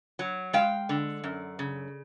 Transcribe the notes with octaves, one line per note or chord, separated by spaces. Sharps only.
F#3
G#3 F5 G5
D3
F#2
C#3